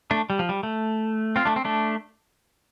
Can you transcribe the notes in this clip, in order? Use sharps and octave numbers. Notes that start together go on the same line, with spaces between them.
A3 D4
G3
F3
G3
A3
C4 F4
A3 D4
C4
A3 D4